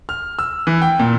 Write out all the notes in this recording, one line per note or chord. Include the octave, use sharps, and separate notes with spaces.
F6
E6
E3
G5
A#2